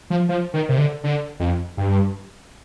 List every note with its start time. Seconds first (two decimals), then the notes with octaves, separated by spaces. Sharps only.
0.10 F3
0.29 F3
0.54 D#3
0.69 C3
0.78 D3
1.04 D3
1.40 F2
1.77 G2